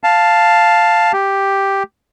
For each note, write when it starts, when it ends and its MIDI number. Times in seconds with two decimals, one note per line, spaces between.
0.04 1.12 77
0.04 1.12 81
1.13 1.83 67